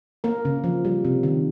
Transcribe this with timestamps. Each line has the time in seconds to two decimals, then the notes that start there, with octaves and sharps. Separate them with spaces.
0.24 A#3 A#4
0.45 C#3
0.64 F3
0.85 G3
1.05 C3
1.23 D#3